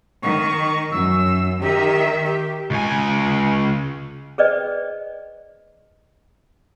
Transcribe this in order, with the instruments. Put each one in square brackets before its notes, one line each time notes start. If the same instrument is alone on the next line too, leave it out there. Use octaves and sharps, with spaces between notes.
[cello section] D#3 [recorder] C#6
[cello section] F#2 [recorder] E6
[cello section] D#3 E5 [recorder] G4
[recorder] G4
[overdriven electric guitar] C#2 G#5
[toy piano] G#4 B4 C5 D5 D#5 G5